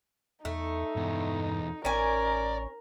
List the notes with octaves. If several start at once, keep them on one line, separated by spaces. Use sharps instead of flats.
E2 A3 D#4
E2 G2 B2
A1 C#4 A#4 D5 G#5